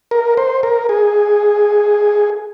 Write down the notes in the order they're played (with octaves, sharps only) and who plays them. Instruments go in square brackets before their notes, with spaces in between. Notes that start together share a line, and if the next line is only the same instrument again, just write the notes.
[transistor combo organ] A#4
C5
A#4
G#4